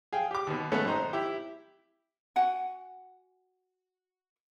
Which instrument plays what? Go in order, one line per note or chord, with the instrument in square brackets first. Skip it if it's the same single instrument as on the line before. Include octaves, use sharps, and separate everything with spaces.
[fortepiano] G#4 F5 G5
G4 D6
D#2 B2
G#3 A3 B3 C#4 A4
G#1 D#4 C5 A#5
E4 G4
[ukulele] F#4 F#5 G#5